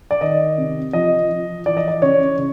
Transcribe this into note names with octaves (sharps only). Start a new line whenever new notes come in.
D5
D#3 D#5
C3
F3 D#5
F3
E3 D5
D#5
D5
C#3 C#5
C#3